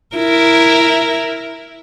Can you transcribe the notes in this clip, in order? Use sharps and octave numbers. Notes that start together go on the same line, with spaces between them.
E4 A#4